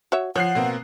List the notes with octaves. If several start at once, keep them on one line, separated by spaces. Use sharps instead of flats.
F#4 C#5 E5
F3 C#5 F#5 F#6 C7
B2 A#3 C4